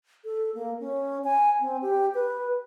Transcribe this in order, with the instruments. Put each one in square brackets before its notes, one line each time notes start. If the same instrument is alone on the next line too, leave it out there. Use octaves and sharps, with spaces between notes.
[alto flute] A4
A#3
C#4
G#5
C4
G4
B4